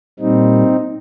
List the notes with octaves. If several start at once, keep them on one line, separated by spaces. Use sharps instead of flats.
A#2 G3 C4 D#4